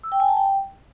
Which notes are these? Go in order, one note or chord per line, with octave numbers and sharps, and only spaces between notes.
E6
G5
G#5
A5
G5